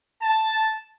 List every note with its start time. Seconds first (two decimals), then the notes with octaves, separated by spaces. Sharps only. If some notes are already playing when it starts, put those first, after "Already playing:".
0.21 A5